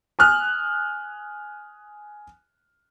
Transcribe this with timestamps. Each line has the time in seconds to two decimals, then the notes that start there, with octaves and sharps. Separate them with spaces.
0.19 G#5 D#6 F6 F#6